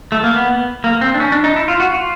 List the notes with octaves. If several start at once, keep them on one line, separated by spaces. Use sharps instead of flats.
A3
A#3
B3
A#3
C4
D4
C#4
D4
D#4
E4
F4
F#4
F4